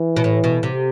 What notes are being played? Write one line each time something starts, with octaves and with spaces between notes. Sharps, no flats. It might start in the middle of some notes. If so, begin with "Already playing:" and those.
Already playing: E3
B2
A2
B2
C3